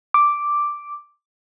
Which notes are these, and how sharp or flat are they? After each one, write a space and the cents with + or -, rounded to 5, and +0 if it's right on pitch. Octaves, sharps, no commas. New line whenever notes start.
D6 +0